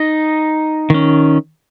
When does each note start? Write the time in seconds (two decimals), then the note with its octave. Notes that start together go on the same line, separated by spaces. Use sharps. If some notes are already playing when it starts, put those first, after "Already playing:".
Already playing: D#4 D#5
0.90 D#3 C#4